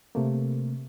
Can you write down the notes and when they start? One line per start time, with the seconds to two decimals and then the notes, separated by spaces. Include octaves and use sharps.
0.15 C3 A3 A#3